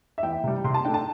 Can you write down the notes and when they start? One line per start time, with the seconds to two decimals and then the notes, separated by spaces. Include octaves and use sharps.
0.18 E5
0.23 E2 G5
0.44 C3 G3
0.64 C3 C6
0.74 A5
0.85 A3 D4 G5
0.94 A5